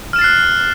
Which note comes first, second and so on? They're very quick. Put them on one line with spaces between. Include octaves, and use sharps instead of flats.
F6 E7 A6 C7 F#6